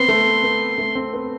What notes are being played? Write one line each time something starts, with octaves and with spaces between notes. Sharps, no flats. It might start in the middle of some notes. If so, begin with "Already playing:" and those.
Already playing: B3 C4 C6
A3
B3
A3
C4
B3